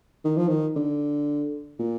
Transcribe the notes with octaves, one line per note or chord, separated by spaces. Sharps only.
D#3
F3
D#3
D3
A#2